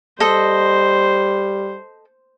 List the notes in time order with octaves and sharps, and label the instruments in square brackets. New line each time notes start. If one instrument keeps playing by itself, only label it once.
[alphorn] G3 [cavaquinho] A4 D#5 [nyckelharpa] C5